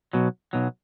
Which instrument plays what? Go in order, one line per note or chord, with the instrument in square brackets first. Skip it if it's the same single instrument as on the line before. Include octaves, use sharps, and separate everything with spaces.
[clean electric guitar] B1 B2 F#3
B1 B2 F#3